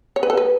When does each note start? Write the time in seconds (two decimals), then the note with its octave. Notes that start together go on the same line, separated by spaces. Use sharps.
0.16 C#5
0.23 B4
0.30 A4
0.37 B4